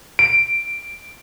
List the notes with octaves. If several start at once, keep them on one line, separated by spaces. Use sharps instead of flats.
D7